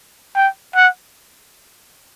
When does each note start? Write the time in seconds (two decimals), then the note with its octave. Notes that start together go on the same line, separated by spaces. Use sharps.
0.35 G5
0.75 F#5